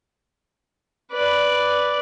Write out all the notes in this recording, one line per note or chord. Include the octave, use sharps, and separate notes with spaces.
B4 D5